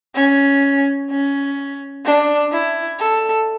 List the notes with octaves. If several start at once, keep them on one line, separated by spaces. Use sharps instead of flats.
C#4
C#4
D4
E4
A4